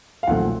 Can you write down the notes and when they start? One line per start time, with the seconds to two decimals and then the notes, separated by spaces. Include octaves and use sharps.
0.23 F5
0.27 B1 A#2 F3 A3 C4 F#5